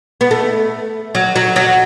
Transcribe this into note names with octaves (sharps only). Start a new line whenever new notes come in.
B3
A3
F#3
F#3
F#3